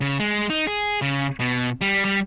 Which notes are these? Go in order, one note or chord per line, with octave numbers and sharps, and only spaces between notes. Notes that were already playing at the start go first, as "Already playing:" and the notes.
C#3
G#3
D#4
G#4
C#3
B2
G3
G3